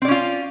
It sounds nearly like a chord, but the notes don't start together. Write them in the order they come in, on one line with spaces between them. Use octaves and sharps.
C4 D5 C#4 F4